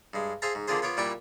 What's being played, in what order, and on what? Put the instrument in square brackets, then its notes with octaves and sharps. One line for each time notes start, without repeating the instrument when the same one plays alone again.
[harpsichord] G2 G#3
G#4 C5 E5 F5 A5 A#5
G#2
D3 A#3 D4 F4 G#4 C5
B3 F4 C#5 D6
A#2 G3 E4 D5 G5 C#6